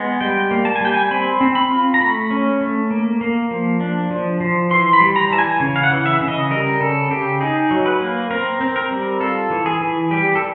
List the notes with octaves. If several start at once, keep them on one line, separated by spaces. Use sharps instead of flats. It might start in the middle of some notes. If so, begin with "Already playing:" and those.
Already playing: G#3 B3
G3 G5
A#3
A5
G#5
G3 G5
G#5
C4 B5
C4
B5
F4
A#5
A3 B5
C#4
A3
A#3
A#3
F3
D4
F3
F3
E3 C6
B5
G3
A#5
E3 A5
G#5
C#3
F5
F#5
E3
E5
C#3
D#5
G3 A#4
C#3 A4
C#3 G4
D#4 G#4
F#3
B4
A#3
C4 A#4
C4
A#4
G3
F4 A4
E3
G#4
E3
G3 G4
A4